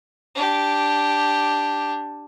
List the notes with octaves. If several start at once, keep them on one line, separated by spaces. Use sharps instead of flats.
D4 G4